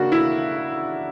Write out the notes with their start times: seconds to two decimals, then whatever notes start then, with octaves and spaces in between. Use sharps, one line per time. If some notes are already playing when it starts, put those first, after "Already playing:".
Already playing: C#3 A#3 D4 F#4
0.12 E4